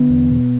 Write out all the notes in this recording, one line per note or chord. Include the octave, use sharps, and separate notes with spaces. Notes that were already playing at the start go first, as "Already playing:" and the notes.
Already playing: D3 B3
E2
B2